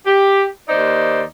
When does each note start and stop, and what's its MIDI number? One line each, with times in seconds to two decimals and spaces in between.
0.05 0.44 67
0.69 1.22 39
0.69 1.22 63
0.69 1.22 72
0.69 1.22 74